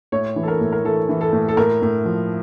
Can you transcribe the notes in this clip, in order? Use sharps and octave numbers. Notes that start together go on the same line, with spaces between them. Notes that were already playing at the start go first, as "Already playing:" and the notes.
A2 C#5
E3
A4
A#4
A2
A#4
E3 A4
E3
A4
A2
A4
A2 A#4
A2
F3